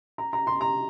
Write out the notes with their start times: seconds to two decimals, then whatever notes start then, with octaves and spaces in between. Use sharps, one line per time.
0.18 A#5
0.33 A#5
0.47 C6
0.61 A#5